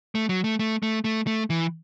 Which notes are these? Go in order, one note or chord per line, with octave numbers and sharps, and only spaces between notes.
A3
F#3
A3
A3
A3
A3
A3
E3